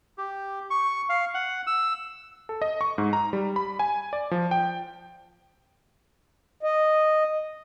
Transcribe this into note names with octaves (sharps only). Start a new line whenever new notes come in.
G4
C#6
F5
F#5
E6
A4
D#5
C#6
G#2
A#5
G3
B5
G#5
D5
F3
G5
D#5